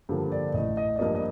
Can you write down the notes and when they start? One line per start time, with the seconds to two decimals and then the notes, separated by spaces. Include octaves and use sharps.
0.09 G2 D3 F3 A#3
0.32 D5
0.54 A1 A2 A3 D#5
0.77 D#5
0.96 D5
0.99 G2 F3 A#3 D#5
1.15 D#5